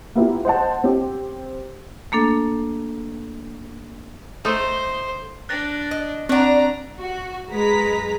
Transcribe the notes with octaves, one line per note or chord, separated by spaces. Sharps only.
A#3 B3 E4 F4 G4
C5 D#5 F#5 A5
C4 G4
A3 A#3 D4 A4
A3 D#4 A4 C5
D4 F#6 A6 A#6
D#5
B3 C4 D4 D5 A#5 F#6
F#4
F#2 G#3 B4 A#5 B6